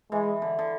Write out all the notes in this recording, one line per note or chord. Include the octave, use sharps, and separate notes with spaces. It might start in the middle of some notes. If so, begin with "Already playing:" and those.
E3 G#3
D3
D3